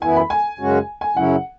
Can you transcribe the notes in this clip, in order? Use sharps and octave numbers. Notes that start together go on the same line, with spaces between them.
F#2 E3 B3 E4 G#5
B5
G#5
F#2 C#3 G#3 C#4 F#4
G#5
F#2 C#3 F#3 C#4 E4 F#5